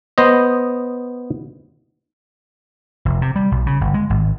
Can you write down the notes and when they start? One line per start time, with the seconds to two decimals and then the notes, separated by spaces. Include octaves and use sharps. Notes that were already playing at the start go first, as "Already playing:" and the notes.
0.18 B3 C5 D#5
3.05 F1
3.22 C3
3.36 G3
3.51 B1
3.66 C#3
3.81 G1
3.94 G#3
4.10 G#1